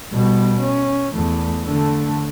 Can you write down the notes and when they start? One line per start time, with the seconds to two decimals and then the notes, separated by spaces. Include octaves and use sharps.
0.13 B2 G3
0.60 C#4
1.13 E2 A3
1.66 D3 A3